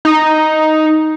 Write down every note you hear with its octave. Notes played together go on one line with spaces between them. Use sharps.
D#4